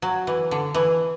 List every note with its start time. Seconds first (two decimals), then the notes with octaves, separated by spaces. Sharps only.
0.02 F#3
0.27 E3
0.51 D3
0.75 E3